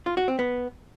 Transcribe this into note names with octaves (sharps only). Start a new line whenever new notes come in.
F4
F#4
C4
B3